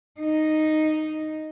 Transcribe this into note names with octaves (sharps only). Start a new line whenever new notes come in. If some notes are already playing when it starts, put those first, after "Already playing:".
D#4